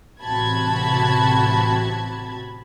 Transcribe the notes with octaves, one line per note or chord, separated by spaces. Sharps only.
A1 C3 F#4 A5 B5 G#6